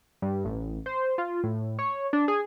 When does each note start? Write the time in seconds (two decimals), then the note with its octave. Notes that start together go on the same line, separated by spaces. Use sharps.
0.22 G2
0.45 A1
0.86 C5
1.18 F4
1.44 A2
1.79 C#5
2.13 D4
2.28 G#4